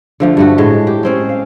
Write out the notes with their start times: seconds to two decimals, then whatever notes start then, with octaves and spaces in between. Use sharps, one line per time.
0.20 D3 F3 A3
0.37 G2 A3 F#4
0.58 A2 G#3
0.87 G4
1.03 G#3 C4 C#4
1.29 F5